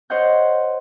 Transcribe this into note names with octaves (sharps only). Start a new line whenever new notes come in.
C5 C#5 D#5 F#5 G6